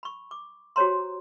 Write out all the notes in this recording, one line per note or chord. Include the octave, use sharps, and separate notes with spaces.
B5 C#6
D6
F#4 G4 C5 C#5 A#5 C6